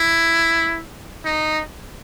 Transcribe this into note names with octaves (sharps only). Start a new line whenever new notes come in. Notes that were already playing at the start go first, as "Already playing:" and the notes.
Already playing: E4
D#4